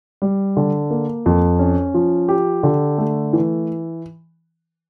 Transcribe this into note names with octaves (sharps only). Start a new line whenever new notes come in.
G3
D3
A#3
F2
C#4
F3
G4
D3
A3
E3